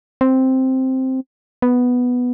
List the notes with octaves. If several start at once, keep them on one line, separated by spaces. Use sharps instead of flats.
C4
B3